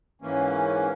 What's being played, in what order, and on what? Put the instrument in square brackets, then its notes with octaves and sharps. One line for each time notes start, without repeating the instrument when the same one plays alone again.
[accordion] G#2 E3 A#3 C#4